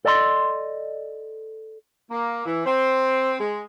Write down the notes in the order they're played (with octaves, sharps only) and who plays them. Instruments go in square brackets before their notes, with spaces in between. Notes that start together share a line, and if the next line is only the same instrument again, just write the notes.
[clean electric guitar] A4 D5 D#5 A5 C6
[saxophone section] A#3
E3
C4
G#3